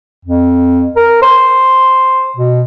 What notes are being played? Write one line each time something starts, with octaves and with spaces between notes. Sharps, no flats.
F2
A#4
C5
B2